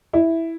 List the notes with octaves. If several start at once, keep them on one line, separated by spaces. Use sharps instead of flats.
E4